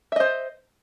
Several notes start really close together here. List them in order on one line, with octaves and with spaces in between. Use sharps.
E5 D#5 C5